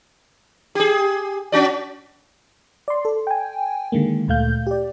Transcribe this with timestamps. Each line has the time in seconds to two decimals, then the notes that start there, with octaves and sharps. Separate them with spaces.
0.75 G4 G#4
1.52 C#4 F#4 D5
2.88 D5 C6
3.05 A4
3.27 G5 G#5
3.92 D3 D#3 G#3 A#3
4.28 D2 A#2 A3 F5 G6
4.67 G4 D5